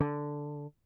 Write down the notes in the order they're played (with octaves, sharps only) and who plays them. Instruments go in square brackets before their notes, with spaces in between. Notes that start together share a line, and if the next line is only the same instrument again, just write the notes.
[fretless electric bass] D3